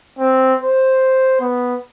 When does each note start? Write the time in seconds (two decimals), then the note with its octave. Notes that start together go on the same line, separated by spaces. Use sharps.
0.19 C4
0.62 C5
1.41 B3